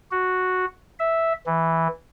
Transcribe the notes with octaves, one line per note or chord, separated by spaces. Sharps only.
F#4
E5
E3